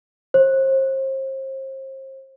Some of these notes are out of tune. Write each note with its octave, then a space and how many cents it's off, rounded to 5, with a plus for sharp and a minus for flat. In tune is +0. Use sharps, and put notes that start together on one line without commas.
C5 +35